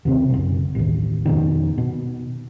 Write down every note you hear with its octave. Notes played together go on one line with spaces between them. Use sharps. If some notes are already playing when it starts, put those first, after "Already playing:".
D#2 C3 C4
F#1 B1
A1 D#2
F2 B2 D#3
B2